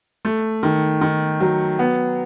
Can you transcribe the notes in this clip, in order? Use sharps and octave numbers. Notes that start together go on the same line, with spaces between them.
A3
D#3
D#3
F#3
B3